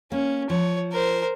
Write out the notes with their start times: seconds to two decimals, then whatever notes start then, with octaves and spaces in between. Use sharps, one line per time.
0.12 A#3 C#4
0.50 F3 C#5
0.92 A#4 C5